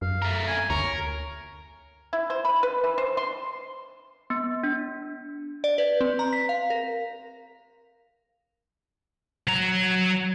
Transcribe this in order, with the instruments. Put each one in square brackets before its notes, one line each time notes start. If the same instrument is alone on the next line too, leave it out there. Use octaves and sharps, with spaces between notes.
[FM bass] F#2 [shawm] F5
[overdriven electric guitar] A3 A#4
[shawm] G#5
[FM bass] D2 [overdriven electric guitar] A#4 [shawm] C#5
[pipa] E4
C5
B5
B4
E3
C5
C6
[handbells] B3
D4
[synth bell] D5
B4
C4
A#5
B6
F5
A#4
[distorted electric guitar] F#3 A#5